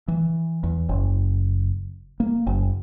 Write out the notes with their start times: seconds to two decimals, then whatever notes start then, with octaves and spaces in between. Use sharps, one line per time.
0.08 E3
0.63 E2
0.89 F#1
2.20 A#3
2.47 F#1